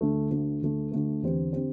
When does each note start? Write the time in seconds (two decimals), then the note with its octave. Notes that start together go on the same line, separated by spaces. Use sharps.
0.01 D2 D3 A3
0.31 D2 D3 A3
0.62 D2 D3 A3
0.92 D2 D3 A3
1.23 E2 D3 C4 G4 C5
1.53 D3 C4 G4 C5